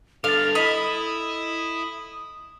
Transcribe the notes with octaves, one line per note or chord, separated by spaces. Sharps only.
G2 D3 A4 F5 A6 F7
E4 D#5 B5 D#6